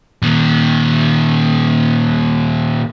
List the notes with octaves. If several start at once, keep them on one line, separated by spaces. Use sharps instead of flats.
A#2 D#3